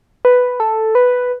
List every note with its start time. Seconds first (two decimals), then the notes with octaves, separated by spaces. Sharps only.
0.25 B4
0.60 A4
0.95 B4